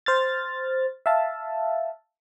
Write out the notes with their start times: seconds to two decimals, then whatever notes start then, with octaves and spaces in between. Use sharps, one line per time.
0.06 C5 F6 A6
1.06 E5 F5 A5